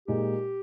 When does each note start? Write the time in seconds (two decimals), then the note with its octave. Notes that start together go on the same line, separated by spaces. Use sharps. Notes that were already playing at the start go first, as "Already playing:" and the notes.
0.08 A#2 G#3 D#4 G4